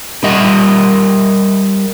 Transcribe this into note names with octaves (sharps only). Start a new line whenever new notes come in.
G3 G4 A#4 D#5 E5 F#5